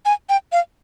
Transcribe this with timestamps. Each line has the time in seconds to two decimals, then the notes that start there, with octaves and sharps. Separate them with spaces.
0.05 G#5
0.29 G5
0.52 F5